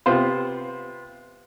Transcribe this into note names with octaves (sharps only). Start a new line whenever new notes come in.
C3 B3 F4 C5